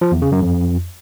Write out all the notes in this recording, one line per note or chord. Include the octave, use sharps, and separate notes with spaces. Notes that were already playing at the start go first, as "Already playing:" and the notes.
F3
E2
C#3
F#2
F2